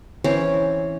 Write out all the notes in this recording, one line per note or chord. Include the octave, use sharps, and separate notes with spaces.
E3 C4 C#4 C#5